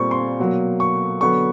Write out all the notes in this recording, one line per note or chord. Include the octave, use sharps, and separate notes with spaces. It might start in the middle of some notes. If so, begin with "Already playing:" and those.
Already playing: A#2 G3 C4 C#6
C6
B2 F#3 A#3
C#6
D3 F#3 B3 C#6